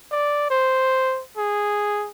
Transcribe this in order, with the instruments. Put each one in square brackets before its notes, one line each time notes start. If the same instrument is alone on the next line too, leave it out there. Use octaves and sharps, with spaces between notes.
[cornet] D5
C5
G#4